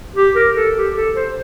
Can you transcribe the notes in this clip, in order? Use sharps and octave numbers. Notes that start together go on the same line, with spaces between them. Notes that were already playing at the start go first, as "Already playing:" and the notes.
G4
A#4
A4
G4
A4
C5